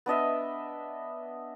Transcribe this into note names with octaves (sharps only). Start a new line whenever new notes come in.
B3 D4 D#5 E5